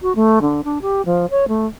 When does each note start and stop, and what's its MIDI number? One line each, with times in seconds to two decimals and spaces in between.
0.02 0.13 66
0.15 0.39 57
0.42 0.64 50
0.64 0.79 62
0.82 1.02 67
1.05 1.26 53
1.31 1.48 73
1.48 1.66 57